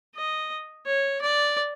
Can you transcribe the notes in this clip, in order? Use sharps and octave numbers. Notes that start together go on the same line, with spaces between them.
D#5
C#5
D5